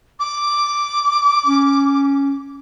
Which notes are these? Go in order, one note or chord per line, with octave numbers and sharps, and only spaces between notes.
D6
C#4